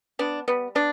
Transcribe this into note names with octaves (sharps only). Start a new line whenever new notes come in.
B3 D4
G3 B3
B3 D4